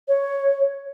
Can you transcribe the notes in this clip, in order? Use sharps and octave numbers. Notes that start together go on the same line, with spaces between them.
C#5